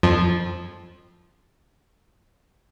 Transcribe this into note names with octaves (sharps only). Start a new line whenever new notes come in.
F2 F3